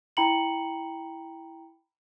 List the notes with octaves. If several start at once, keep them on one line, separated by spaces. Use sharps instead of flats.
E4 G5 A#5 B5 C#7 F#7